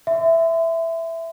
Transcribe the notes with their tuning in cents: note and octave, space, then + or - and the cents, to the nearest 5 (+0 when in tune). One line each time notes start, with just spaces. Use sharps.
E5 +0 C6 -40